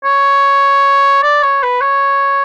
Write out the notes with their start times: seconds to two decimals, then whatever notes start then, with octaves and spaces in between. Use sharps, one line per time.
0.04 C#5
1.23 D5
1.43 C#5
1.63 B4
1.81 C#5